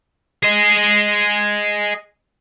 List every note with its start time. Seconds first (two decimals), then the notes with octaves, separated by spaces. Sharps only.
0.43 G#4 D#5